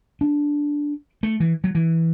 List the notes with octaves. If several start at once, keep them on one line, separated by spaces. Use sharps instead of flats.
D4
A3
E3
F#3
E3